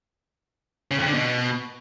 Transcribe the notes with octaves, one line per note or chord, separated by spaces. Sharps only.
C#3
F2
D3
B2